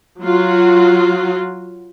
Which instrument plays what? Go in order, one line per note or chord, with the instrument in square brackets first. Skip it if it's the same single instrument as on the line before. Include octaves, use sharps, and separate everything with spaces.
[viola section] F#3 F4 F#4